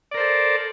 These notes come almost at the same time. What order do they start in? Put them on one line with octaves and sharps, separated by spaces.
D5 A#4 C5 A4